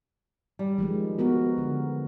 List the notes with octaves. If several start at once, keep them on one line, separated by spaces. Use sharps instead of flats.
G3
D#3 F3 G#3
B3 F#4 A#4
D3